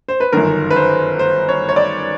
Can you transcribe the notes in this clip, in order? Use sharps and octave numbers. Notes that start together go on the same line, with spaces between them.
C5
B4
G1 F#2 D#3 A#4
B4
C5
C5
C#5
C#5
D5